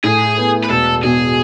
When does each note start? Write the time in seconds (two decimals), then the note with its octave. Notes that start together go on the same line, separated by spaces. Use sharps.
0.04 A2 G#4
0.38 B3
0.63 B4
0.70 E1 A4
1.03 B2 G#4